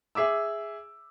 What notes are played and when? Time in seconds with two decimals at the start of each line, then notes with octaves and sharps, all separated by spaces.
0.15 G#4 E5 D6 E6